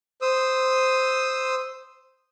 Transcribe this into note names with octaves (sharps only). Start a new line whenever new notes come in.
C5 D#6 E6